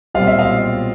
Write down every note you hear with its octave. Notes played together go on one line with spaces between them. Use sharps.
B1 A#2 G3 C4 F4 F5
E5
D#5 F5